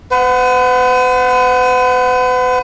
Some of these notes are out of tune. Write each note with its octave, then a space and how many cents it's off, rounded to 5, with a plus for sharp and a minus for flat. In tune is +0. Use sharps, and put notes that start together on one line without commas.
B4 +45 F#5 -5